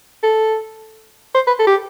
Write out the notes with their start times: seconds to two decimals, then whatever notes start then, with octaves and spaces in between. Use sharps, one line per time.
0.23 A4
1.35 C5
1.47 B4
1.59 A4
1.67 G4